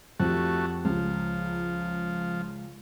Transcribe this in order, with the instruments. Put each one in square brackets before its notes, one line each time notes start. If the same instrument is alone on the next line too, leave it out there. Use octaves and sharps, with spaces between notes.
[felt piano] F2 G4 [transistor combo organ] A3 F#4
[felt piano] C#2 [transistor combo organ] F3